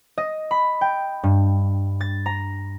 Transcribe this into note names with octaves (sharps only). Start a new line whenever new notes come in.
D#5
B5
G5
G2
A6
A#5